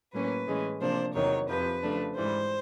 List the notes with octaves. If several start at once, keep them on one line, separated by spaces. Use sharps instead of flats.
A2 F#3 A#3 C#4 B4
A2 E3 G#3 C#4
C3 F3 A#3 D4 C5
E2 C3 D#3 F#3 C#5
F2 C3 F3 B4
C#3 F3 A3 D4
G#2 E3 G3 C5